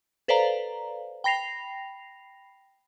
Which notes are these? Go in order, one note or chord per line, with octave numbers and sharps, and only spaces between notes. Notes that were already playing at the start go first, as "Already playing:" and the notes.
A4 B4 C5 D5 F5 A#5
G5 B5 A#6 C7 F7